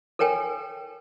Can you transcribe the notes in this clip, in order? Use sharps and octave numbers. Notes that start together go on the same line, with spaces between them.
A4 A#4 C#5 G5 G#5